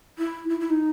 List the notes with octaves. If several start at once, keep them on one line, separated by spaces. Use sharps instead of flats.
E4
E4
E4
D#4